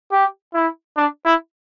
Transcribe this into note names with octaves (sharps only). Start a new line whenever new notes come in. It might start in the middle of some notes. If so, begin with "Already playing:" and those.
G4
E4
D4
E4